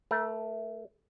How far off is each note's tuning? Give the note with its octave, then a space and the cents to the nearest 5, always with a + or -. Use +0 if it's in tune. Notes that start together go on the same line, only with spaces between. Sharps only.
A3 +0 A#4 +40